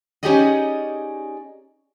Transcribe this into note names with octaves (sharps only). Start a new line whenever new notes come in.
C#4 D#4 G4 G#4 D5 D#5